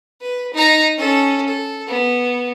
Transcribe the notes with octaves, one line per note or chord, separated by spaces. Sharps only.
B4
D#4 A#5
C#4 A4
A4
B3